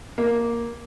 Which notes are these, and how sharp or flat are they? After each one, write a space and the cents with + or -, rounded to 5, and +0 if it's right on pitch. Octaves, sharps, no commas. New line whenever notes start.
A#3 +5